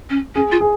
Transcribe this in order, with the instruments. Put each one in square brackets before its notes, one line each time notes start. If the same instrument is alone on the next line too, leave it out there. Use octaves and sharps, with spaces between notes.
[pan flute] C#4
[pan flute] C#4 [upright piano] G#4
[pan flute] F4
[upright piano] G#4